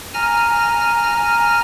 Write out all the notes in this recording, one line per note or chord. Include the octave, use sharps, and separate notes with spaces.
G#5 A#5 F6 A#6